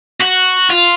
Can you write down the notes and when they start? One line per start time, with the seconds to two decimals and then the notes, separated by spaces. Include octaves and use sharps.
0.20 F#4
0.70 F4